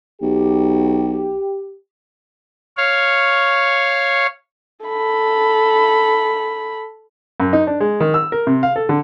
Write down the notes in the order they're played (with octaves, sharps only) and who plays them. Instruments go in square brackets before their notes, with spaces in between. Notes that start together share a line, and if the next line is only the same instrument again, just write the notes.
[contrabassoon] B1 [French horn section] G4
[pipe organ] C#5 F5
[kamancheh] A4 B5
[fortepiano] F#2
D#4
D4
G#3
D#3
E6
A#4
C3
F5
A4
D3